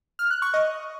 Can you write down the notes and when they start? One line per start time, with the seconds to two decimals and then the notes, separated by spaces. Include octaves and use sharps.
0.19 F6
0.31 F#6
0.42 C#6
0.54 D#5